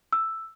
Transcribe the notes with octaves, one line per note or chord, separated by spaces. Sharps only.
E6